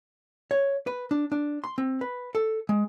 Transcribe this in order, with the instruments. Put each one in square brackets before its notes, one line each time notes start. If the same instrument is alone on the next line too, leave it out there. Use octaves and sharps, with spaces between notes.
[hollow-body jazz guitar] C#5
B4
D4
D4
C6
C4
B4
A4
G#3